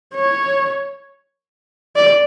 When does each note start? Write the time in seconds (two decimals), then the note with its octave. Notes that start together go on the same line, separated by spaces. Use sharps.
0.14 C#5
1.96 D5